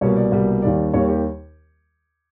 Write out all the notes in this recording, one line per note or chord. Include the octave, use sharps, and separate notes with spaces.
C2 B2 G3 A#3 C#5
D5
C2 B2 G3 A#3
D#2 D#3 G3 A#3 D5
D#2 D#3 G3 A#3 C#5
G4